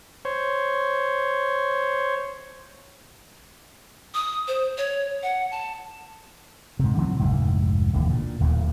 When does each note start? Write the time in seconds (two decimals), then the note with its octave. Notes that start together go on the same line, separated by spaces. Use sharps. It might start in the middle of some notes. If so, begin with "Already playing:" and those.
0.25 C5 C#5
4.14 D#6
4.48 C5
4.78 C#5
5.23 F#5
5.51 A5
6.79 G#2 C3
6.98 D3 E3 F#3 C4
7.19 F1 D2 G#2
7.93 E1 A1 D#2 C#3
8.09 A#2 D3
8.40 D1 D#2 A#2